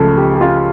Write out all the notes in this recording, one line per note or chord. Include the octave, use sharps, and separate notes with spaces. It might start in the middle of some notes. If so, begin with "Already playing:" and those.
Already playing: C#2 C#3 F3 A3 A4
G4
G4
F4